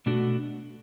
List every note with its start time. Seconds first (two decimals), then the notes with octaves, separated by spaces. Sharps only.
0.06 B2 A3 D4 F#4